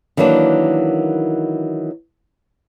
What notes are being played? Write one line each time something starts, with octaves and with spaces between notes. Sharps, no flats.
D#3 E3 F#3 A#3 D4